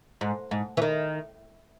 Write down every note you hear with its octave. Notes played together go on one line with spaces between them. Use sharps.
G#2
G#2
E3
D#3